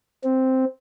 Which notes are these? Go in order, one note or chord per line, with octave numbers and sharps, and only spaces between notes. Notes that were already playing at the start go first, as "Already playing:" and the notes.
C4